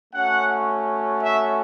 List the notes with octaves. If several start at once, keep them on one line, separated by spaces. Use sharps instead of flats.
A3 C#4 F#4 F#5
E5